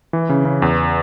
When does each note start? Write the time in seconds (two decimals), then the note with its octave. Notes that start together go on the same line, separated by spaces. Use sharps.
0.13 E3
0.29 C#3
0.45 C#3
0.62 E2